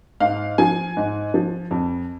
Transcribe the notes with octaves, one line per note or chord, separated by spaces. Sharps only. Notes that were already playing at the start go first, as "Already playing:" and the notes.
G#2 F5
F3 G#5
G#2
F3
F2